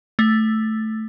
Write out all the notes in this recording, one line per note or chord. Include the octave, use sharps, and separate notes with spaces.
A3